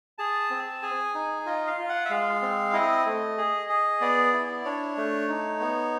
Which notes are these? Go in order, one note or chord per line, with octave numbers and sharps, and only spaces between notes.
G#4 A5
C4
G#4 G#5
D#4
F4 D#5
F5
F4
F#5
E5
G#3 F5
C4
E4 D#5
A3
G#4
G#4
B3 D5
E4
D4 C#5
A3
D#4
B3